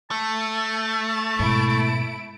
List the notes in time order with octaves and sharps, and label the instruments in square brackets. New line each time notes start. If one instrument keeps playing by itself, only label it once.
[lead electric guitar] A3 [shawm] A5
[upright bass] G#2 B2 [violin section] E4 D7